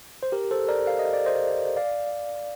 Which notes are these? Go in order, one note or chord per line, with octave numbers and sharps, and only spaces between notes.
C5
G4 A#4
A4 C5
A#4 D5
F5
D#5
D5
C5 D#5
D5 F5